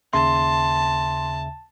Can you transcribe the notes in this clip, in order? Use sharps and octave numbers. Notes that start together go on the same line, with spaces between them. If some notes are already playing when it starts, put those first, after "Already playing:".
D#2 C#3 E5 A5 C6